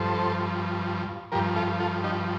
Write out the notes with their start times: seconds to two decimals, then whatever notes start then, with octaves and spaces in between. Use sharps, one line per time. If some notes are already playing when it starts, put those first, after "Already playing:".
Already playing: G2 F3 A4 C5
1.32 F3 G4 A#4
1.35 G2
1.56 F4 A4
1.80 F4 A4
2.04 D#4 G4